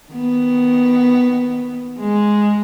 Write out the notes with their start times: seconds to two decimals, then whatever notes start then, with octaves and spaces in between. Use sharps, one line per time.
0.12 D#3 B3
1.99 G#3